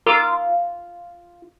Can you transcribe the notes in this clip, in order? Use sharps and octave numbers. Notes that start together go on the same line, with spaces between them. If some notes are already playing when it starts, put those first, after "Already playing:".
F4 A#4 D6 E6